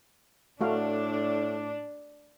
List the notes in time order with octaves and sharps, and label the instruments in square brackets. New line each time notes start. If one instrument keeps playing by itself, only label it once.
[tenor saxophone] A2 [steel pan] A3 F#4 F5 [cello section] D4